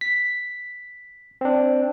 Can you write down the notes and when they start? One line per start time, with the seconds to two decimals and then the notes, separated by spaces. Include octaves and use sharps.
0.01 B6
1.41 C4 D4